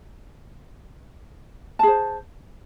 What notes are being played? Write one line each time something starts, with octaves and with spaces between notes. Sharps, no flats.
G#4 C5 A5